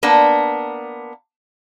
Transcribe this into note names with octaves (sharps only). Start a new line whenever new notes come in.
A#3 B3 D4